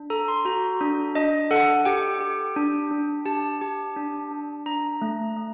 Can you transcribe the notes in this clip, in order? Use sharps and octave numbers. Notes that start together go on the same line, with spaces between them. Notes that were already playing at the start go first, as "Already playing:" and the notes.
Already playing: D4
A4 A#5
C6
F#4 A#5
D4
D4 D#5
A4 F#5
G4 G5
G4
D4
D4
G4 A5
G4
D4
D4
D4 A#5
A3
A3